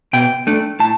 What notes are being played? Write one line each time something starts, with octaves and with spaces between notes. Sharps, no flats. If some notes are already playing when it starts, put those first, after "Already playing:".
B2 G5
A3 D4
A2 A5